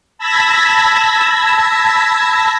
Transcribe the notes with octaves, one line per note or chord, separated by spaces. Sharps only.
A5 B5 E6 G#6 A#6 B6